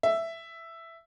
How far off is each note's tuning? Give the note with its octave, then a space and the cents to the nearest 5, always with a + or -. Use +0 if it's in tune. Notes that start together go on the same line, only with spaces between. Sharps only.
E5 +5